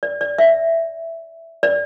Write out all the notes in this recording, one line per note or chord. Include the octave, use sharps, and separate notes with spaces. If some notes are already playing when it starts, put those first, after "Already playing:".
D5
D5
E5
D5